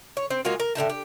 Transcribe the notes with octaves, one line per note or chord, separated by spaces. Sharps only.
C#5
C4
G#3 A#3 F4 F#4
A#4
A2 D3 D#4 A5
G4